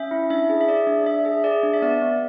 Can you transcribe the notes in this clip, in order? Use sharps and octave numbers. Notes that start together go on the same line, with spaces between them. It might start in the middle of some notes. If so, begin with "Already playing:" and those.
Already playing: C#4 E5
E4
D4 E5
G#4
E5
G#4 D5
D4
D4 E5
G#4 E5
G#4 D5
D4
E5
B3 D5
B3